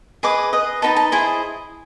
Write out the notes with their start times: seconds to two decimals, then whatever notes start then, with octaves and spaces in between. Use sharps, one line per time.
0.23 G#4 B4 D#5 D6
0.53 G#4 B4 D#5
0.82 D#4 F#4 B4 D#5 A5
0.96 A5
1.12 E4 G#4 C5 D#5 G#5